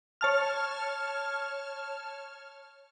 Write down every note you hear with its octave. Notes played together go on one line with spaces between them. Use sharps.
C#5 A5 F6